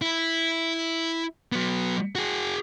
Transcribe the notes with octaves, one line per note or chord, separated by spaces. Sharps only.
E4
F#3 B3
F#4 G#4